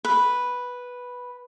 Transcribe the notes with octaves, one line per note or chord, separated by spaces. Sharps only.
B4